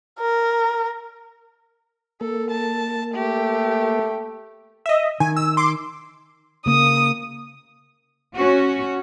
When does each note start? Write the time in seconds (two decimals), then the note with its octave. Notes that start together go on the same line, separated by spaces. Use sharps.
0.19 A#4
2.21 A#3 A4
2.51 A5
3.14 A3 G4
4.86 D#5 E5
5.20 D#3 G#5
5.37 E6
5.57 C6 D6
6.66 C#3 A#3 D#6
8.35 C#4 F#4